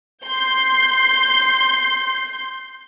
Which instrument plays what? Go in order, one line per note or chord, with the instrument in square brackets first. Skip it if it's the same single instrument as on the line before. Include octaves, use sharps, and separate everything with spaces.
[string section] C6 G6